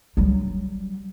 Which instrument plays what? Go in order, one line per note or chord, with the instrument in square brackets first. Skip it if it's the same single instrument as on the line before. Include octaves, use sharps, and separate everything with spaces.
[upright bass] F#3 G3